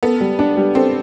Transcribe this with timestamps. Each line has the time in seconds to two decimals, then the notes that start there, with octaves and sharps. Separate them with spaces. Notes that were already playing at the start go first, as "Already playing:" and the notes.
0.03 B3 A4
0.21 G3
0.39 D4
0.57 G3
0.75 C4 A4